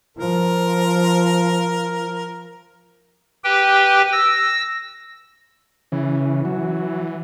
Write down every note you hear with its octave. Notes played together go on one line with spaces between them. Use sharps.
F3 A#4
G4 B4 G5
E6 A#6
C#3 E3
F#3